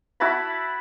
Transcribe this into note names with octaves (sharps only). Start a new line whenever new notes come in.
E4 F#4 A5 B5